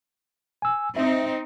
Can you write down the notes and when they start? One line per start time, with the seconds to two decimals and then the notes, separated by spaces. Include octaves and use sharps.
0.62 G#5 E6
0.97 C4 D#4 E5